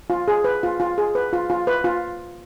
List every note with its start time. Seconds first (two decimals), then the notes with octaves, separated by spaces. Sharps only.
0.10 F4
0.28 G#4
0.44 B4
0.63 F4
0.80 F4
0.98 G#4
1.15 B4
1.33 F4
1.50 F4
1.67 B4
1.84 F4